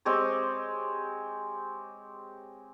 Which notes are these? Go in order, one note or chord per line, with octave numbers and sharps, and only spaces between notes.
G#3 C4 G4 C#5